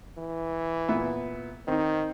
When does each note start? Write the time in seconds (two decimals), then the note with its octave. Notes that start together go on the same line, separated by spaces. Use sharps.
0.18 E3
0.89 A#2 B3 E5
1.68 D#3 C4 D#4